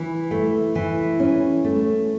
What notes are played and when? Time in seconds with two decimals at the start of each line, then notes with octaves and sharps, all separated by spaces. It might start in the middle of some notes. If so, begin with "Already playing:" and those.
Already playing: E3
0.31 A3
0.75 E3
1.20 C#4
1.64 A3